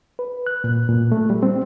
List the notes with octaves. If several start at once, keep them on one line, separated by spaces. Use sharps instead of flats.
B4
F#6
A#2
A#2
A3
G3
C4